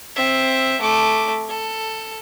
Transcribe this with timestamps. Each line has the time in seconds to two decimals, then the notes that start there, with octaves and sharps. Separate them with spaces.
0.16 C4 E5
0.81 A3 D6
1.49 A4